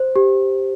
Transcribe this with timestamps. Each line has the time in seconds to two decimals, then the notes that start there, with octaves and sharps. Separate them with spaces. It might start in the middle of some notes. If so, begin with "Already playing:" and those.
Already playing: C5
0.16 G4